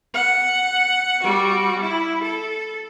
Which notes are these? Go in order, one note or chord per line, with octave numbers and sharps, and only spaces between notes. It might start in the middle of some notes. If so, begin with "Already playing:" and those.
F#5
G3 F#4
E4
A4